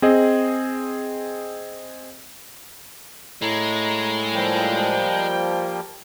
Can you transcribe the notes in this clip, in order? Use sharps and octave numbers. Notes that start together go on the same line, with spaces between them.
C4 G#4 D#5
A2 G#3 A#5
F3 G3 A#3 G5